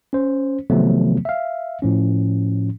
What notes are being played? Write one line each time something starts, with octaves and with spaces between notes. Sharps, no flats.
C#4 C5
C3 D#3 F3 F#3 A3 B3
E5 F5
A2 F3 C#4